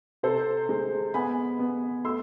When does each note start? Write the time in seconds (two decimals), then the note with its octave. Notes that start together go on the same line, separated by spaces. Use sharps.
0.23 C3 A4 C5
0.69 G#3
1.14 B3 G#5 B5
1.59 B3
2.05 A3 C6 E6